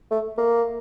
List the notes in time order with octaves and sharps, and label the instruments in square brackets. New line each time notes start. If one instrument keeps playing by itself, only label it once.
[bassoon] A3
A#3